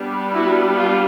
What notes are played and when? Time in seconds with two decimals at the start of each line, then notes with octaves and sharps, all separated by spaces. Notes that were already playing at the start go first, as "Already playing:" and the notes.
Already playing: G3 B3 D4
0.33 E4 F#4
0.77 F4